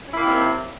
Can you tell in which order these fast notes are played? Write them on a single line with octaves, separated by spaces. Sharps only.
C#4 E4 A#3 D#3 C3